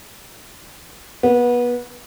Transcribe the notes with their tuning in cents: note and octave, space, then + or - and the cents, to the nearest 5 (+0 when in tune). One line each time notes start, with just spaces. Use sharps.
B3 -25